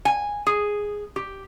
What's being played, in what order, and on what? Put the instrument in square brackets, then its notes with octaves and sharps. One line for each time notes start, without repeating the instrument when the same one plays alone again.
[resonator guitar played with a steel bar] G#5
G#4
G4